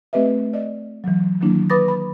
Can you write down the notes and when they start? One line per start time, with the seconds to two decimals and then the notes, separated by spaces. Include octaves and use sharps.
0.13 A3 C4 G4 B4 D#5 E5
0.53 D5 D#5
1.04 E3 F#3
1.41 D#3 F#3 A#3 D4 E4
1.70 B4 B5 D6 D#6 A6 A#6
1.88 B5